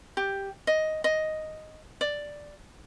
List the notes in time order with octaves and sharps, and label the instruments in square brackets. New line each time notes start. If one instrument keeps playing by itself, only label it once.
[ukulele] G4
D#5
D#5
D5